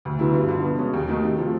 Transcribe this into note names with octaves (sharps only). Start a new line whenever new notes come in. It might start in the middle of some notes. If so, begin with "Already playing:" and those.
D2
D3 F#3 B3 E4
G2
D3 F3
B2
G#3 C#4
D#2
D#3 F#3 A3
C3
F3 A3 C4